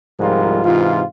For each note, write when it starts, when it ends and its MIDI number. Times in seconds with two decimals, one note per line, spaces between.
0.20 0.62 36
0.20 0.62 44
0.20 0.62 53
0.20 0.62 55
0.20 0.62 65
0.20 0.62 70
0.65 1.03 44
0.65 1.03 48
0.65 1.03 52
0.65 1.03 65